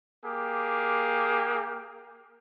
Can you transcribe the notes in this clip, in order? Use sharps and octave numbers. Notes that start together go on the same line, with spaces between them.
A#3 G4 G#4